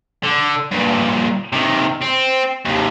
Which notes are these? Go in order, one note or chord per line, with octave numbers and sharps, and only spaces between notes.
D3
G2 A#2
C3 D#3
C4
D#2 C3